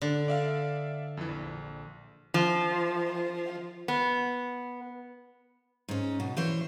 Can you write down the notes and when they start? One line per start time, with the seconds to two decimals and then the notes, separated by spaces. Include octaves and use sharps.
0.02 D3
0.28 D5 E5 F5
1.17 F2 E3
1.29 A#1
2.34 F3
3.88 B3
5.89 G#2 C#4
6.20 B2
6.37 E3 C5 C#5